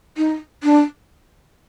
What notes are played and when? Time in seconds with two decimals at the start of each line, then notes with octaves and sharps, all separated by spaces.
0.17 D#4
0.63 D4